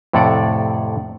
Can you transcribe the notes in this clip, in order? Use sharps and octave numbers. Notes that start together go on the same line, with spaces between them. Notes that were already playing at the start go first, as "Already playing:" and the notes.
F2 A2 C3 A4 D5 F#5